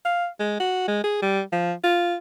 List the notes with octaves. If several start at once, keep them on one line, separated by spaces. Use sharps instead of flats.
F5
G#3
F#4
G#3
G#4
G3
F3
F4